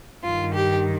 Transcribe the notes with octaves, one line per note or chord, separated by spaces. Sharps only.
G2 D#3 F4
G4